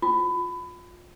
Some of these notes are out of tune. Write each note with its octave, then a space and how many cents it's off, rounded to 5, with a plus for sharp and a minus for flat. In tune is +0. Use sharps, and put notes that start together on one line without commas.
F4 +25